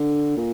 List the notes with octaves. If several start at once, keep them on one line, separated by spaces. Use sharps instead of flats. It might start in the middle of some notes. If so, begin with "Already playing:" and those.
Already playing: D3
A#2